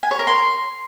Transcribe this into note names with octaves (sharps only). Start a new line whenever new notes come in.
G#5
C#5
A#4
C6